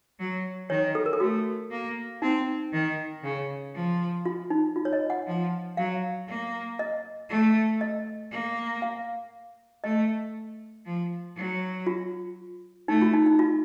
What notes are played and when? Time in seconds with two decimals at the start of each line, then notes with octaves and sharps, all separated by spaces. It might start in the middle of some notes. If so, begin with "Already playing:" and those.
0.19 F#3
0.70 D#3 C#5
0.95 A4
1.06 A#4
1.13 A4
1.20 A3 F#4
1.71 A#3
2.22 C4 D#4
2.73 D#3
3.23 C#3
3.74 F3
4.26 F4
4.50 D#4
4.76 F4
4.85 C#5
4.93 D#5
5.10 F#5
5.27 F3
5.77 F#3 F5
6.28 A#3
6.79 D#5
7.29 A3
7.81 D#5
8.31 A#3
8.82 F5
9.84 A3 D#5
10.85 F3
11.36 F#3
11.87 F4
12.88 A3 D#4
13.02 F4
13.14 D#4
13.26 D#4
13.39 F4